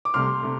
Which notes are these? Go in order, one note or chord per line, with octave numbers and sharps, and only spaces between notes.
D6
C2 C3 A3 C6 F6
C3 A3